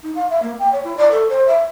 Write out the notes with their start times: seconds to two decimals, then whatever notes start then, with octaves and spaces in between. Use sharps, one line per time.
0.03 D#4
0.15 F5
0.30 E5
0.42 A#3
0.59 G5
0.72 C#5
0.84 E4
0.97 D5
1.11 A4
1.29 C5
1.47 E5